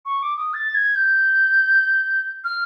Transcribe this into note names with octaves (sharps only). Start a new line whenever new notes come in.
C#6
D6
D#6
A6
G#6
G6
F6